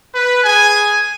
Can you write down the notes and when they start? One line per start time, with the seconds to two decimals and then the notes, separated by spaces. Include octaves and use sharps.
0.14 B4
0.44 G#4 G#5